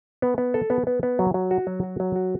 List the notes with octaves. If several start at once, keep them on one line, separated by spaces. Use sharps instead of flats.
B3
B3
A4
B3
B3
B3
F#3
F#3
F#4
F#3
F#4
F#3
F#4